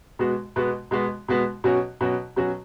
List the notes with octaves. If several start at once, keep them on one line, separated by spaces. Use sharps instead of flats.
B2 G#3 B3 F#4
B2 G#3 B3 F#4
B2 G#3 B3 F#4
B2 G#3 B3 F#4
B2 F#3 C#4 F#4
B2 F#3 C#4 F#4
B2 F#3 C#4 F#4